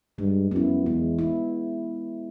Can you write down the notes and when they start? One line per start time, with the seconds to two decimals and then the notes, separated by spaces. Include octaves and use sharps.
0.18 G2 G#3
0.51 F#2 B3 E4
0.85 E2 G#3
1.19 B3 E4